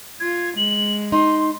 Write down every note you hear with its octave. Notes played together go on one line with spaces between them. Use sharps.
F4 G#6
G#3 F#7
D#4 C6